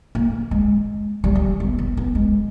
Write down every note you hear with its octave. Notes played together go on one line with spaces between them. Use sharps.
A#3
G#3
G3
G3
B3
B3
B3
G#3